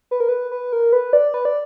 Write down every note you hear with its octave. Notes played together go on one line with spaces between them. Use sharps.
B4
A#4
B4
B4
A#4
B4
D5
B4
D5